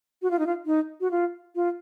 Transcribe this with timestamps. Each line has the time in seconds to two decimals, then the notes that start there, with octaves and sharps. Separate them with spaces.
0.22 F#4
0.31 F4
0.39 D#4
0.47 F4
0.66 D#4
1.01 F#4
1.11 F4
1.55 F4